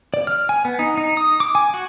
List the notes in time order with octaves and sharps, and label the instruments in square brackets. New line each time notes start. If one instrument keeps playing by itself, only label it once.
[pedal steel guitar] D5
F6
G#5
B3
D#4
D#4
D#6
D6
G#5
F#4